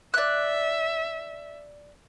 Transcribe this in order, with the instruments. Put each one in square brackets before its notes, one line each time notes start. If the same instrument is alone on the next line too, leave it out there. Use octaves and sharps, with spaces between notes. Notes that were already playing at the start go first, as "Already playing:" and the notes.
[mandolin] D5 F#6 [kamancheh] E5